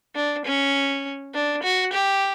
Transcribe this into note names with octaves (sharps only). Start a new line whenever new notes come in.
D4
C#4
D4
F#4
G4